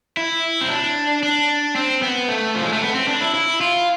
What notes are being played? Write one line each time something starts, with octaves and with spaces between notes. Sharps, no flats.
E4
C4
D4
D4
C4
B3
A3
F3
G#3
A3
B3
C4
D4
E4
E4
F4